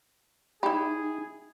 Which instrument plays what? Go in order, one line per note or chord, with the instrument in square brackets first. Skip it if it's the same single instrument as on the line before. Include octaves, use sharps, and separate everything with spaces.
[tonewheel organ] D#4 [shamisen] E4 G4 [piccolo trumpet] G#4 [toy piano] G5 B5